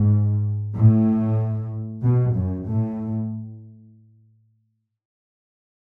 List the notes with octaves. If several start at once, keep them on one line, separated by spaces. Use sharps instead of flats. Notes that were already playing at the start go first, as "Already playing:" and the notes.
Already playing: G#2
A2
B2
F#2
A2